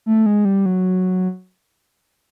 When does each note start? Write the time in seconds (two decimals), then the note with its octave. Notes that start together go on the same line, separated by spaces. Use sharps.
0.06 A3
0.26 G#3
0.45 G3
0.66 F#3